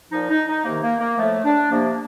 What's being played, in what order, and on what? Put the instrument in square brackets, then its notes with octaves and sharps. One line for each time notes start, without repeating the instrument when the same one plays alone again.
[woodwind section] A#2 F3 D#4
D#4
D#4
C3 D#3 A#3
A#3
A#3
A2 F3 A3
D4
C3 F3 A#3